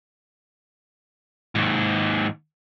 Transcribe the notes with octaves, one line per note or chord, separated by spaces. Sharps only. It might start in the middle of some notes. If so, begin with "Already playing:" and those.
D#2 G#2